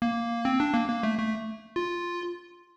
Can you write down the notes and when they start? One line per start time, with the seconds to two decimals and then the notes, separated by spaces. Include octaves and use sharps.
0.02 A#3
0.45 C4
0.60 D4
0.74 A#3
0.88 A#3
1.03 A3
1.18 A3
1.76 F4